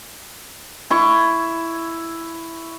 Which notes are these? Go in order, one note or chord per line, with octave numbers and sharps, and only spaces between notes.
E4 C#6